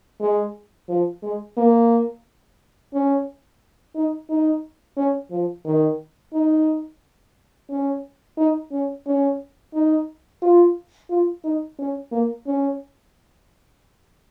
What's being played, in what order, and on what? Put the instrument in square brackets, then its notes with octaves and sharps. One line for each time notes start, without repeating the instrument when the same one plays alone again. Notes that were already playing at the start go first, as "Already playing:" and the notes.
[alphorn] G#3
F3
G#3
A#3
C#4
D#4
D#4
C#4
F3
D#3
D#4
C#4
D#4
C#4
C#4
D#4
F4
F4
D#4
C#4
A#3
C#4